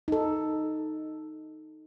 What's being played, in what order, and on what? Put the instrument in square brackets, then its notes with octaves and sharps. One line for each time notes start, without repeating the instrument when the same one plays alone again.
[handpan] D#4 A4